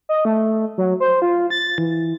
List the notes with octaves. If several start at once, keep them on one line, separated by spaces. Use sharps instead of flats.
D#5
A3
F#3
C5
F4
A6
E3